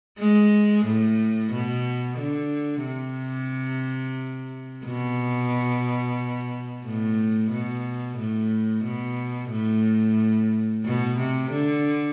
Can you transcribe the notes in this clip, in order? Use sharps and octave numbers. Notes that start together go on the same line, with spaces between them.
G#3
A2
B2
D3
C3
B2
A2
B2
A2
B2
A2
B2
C3
D3